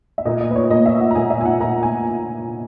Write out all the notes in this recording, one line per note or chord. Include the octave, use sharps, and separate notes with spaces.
E5
A#2 A#3 D#5
D#5
B4
C#5
A#2 A#3 D#5
E5
F#5
A#5
A#2 A#3 G#5
E5
G#5
F#5
A#2 A#3 A#5
G#5